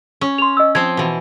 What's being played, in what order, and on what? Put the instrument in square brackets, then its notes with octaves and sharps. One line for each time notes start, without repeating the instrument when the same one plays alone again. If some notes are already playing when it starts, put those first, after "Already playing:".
[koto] C#4
[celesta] C6 F7
D#5 E6
[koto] F3 C4 [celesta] G#6
[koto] B2 E3